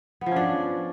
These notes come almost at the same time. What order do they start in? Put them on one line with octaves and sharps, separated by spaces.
B3 F3 C#4 D4